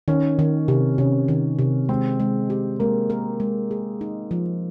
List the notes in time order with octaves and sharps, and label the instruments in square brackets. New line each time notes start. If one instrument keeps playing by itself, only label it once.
[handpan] D#3 [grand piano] C#4
[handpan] D#3
C3
[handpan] C3 [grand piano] C#4
[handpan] D#3
C3
[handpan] G#3 [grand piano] C4
[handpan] G#3
G4
[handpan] G#3 [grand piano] A#3
[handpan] A#4
G#3
G#4
D#4
F3